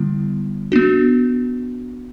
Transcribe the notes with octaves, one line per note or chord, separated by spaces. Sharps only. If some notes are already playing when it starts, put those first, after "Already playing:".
Already playing: D3 G3 B3 E4
B3 D4 F#4